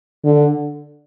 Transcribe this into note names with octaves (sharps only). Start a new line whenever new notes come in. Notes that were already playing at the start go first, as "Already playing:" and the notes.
D3